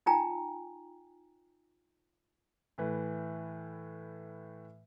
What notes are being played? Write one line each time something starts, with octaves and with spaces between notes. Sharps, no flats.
D#4 F4 G5 G#5 A#5
A2 E3 B4